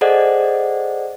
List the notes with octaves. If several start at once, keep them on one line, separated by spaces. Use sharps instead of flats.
G#4 A4 C5 D5 D#5 F#5